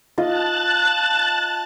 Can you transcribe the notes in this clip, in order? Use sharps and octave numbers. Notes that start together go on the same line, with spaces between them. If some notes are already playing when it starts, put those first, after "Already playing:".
F4 D#5 A5 F#6 A6